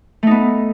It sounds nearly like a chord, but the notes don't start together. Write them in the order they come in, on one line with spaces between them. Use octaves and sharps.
A3 D#4 B3